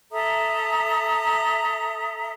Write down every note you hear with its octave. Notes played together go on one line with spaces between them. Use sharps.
A4 E5 A#5 D#6